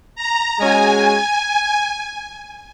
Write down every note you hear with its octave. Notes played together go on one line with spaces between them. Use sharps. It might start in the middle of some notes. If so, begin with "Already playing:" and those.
A#5
G#3 C#4 F#4 G#5